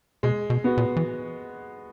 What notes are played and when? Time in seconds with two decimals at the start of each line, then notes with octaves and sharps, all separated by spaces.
0.23 B2 G#3
0.50 B2
0.64 B3 F#4
0.77 A#2
0.97 E3